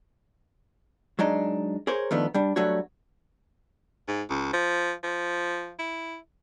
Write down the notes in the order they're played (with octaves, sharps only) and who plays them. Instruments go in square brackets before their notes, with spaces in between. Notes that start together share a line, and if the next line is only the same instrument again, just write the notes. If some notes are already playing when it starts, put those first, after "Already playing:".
[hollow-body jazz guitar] F#3 G#3 D4 D#4
G#4 A#4 C5 C#5
D#3 F3 A3 B3 D4
G3 D4
F#3 G3 A3 D4 F#4 C#5
[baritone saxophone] G#2
C#2
F3
F3
E4